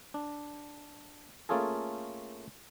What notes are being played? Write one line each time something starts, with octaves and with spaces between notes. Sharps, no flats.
D4
A3 A#3 C#4 F4 G#4 A4